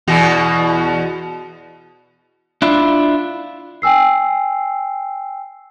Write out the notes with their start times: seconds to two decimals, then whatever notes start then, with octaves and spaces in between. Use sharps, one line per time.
0.07 E2 B2 F#4
2.62 D4 E4 F4
3.82 G5 G#5 E6 C7